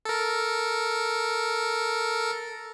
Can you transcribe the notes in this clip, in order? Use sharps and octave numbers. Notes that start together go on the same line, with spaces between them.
A4 A#4